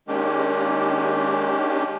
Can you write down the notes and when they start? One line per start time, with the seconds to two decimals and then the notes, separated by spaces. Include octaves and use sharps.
0.08 D#3 G#3 A#3 C#4 D4 G4